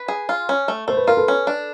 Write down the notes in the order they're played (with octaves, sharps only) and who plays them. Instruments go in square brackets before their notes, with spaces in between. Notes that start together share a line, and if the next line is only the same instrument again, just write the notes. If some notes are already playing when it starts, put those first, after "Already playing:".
Already playing: [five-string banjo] B4
G#4
F4
C#4
A3
[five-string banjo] A3 [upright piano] C5
[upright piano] B4
[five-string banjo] F4 [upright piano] A#4
[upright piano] A4 B4
[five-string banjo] C#4
D4